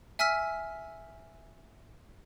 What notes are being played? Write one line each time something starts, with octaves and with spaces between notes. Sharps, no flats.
E5 G#5 E6 F6 B6